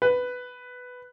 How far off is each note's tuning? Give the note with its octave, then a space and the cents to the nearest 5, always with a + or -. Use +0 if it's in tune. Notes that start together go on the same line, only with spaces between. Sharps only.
B4 +5